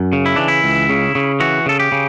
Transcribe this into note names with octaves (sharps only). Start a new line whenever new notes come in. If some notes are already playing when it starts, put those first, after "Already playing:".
Already playing: F#2
C#3
E4
E3 D4
E4
C#2
C#3
C#3
E3 F#4
C#3 A4
G4
C#3